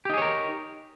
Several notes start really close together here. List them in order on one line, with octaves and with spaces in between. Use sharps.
G4 D#4 G#4 C#5 A#4